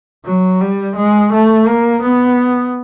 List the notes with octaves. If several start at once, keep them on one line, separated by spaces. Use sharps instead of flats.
F#3
G3
G#3
A3
A#3
B3